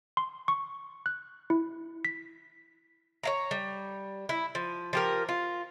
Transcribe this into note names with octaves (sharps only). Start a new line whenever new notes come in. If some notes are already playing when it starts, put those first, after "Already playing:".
C6
C#6
F#6
E4
B6
C#5 F5 A#5
G3
E4
F3
F3 G4 A#4
F4